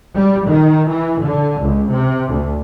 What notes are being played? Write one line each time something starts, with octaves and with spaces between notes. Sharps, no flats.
G3
D#3
E3
D3
C#2
C3
D2